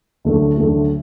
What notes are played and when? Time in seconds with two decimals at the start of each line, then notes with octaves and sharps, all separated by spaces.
0.25 D2 D3 F#3 A3
0.58 D2 D3 F#3 A3